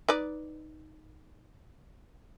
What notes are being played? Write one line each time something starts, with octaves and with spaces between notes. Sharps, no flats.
D#4 B4 D5